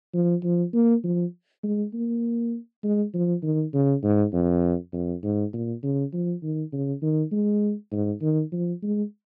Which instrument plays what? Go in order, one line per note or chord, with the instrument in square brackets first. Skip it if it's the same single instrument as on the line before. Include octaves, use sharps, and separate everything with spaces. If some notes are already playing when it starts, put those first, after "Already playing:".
[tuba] F3
F3
A#3
F3
G#3
A#3
G#3
F3
D#3
C#3
G#2
F2
F2
G#2
A#2
C#3
F3
D#3
C#3
D#3
G#3
G#2
D#3
F3
G#3